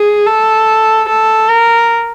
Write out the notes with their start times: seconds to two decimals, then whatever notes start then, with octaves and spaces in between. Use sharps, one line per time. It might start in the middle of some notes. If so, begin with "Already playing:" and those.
Already playing: G#4
0.26 A4
1.09 A4
1.50 A#4